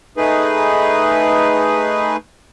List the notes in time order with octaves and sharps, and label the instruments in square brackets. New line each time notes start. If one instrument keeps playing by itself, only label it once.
[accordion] A3 D#4 G#4 B4